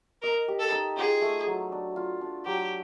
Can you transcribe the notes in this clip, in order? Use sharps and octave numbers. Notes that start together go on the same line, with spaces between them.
A#4 D#5
G4
A4
D#4
F4 G#4
A3
F#3
D4
F4
D4
F#3 G4